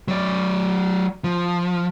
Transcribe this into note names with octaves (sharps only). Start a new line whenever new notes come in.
F#3 D5
F3